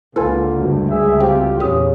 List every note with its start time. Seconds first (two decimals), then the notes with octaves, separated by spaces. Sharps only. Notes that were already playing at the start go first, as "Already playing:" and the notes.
0.16 C#2 D3 A#3 F4 A4 B4 G#5
0.58 D2 G2
0.89 G#4 E5
1.20 C4 F4 G4
1.60 E2 A#2 C#3 G4 D#6